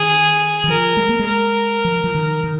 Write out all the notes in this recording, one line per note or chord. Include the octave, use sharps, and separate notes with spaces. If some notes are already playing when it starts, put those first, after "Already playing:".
Already playing: D#3 G#4
D#3
F3 A#4
G#3
A#3
G#3
A#4
F3
F3
D#3
D#3